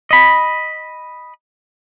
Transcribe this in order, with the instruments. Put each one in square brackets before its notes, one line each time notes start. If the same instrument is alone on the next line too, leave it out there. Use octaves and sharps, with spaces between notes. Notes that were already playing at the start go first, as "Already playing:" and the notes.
[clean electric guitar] D#5 B5